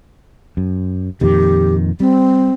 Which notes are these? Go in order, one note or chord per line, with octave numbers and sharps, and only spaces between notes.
F#2
F2 A#2 D#3 G4
G3 C4